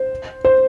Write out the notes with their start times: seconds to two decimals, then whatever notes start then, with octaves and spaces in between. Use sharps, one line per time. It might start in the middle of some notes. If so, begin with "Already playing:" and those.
Already playing: C5
0.45 C5